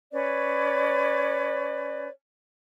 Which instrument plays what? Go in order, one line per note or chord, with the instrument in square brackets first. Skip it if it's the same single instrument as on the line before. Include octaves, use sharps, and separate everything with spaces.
[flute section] C#4 B4 C#5 D5